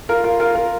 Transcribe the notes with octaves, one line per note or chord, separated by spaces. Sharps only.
F4 A#4
F4 A#4
F4 A#4
F4 A#4